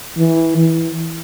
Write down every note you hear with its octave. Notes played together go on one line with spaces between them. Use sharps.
E3
E3